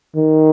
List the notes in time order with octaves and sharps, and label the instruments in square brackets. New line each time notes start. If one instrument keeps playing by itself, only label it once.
[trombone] D#3